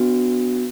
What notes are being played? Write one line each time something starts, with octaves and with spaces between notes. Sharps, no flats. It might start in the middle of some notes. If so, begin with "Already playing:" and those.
Already playing: B3 D4 F#4